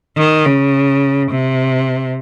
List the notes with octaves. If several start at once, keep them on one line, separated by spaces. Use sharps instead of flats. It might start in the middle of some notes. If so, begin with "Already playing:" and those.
D#3
C#3
C3